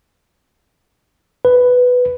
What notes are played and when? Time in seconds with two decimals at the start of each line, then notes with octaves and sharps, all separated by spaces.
1.45 B4